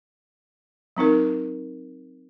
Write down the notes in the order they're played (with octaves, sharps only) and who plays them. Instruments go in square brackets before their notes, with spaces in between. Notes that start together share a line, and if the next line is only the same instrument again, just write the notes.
[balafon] F#3 C4 D#4 A#4